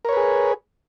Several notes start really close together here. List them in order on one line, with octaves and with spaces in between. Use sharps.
A#4 C#5 B4 G#4